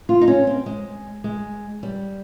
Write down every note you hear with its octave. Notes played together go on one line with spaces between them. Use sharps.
F4
D#4
C#4
C4
G#3
G#3
G3